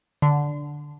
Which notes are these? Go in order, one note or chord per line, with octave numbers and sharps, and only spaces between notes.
D3